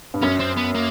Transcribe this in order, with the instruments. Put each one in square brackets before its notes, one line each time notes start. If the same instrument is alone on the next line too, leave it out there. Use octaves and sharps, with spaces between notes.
[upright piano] G2
[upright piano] F#2 [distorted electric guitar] C#4
[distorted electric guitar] C4
B3
A#3